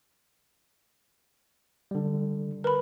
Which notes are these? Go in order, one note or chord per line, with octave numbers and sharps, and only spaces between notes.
D3 G3
A#4 B4 B5